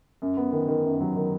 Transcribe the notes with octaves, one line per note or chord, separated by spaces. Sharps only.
F#2
B3
D#3
D#3
F#2
F#3
D#3